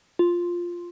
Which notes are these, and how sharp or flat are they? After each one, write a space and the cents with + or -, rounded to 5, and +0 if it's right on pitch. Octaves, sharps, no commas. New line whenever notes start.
F4 +0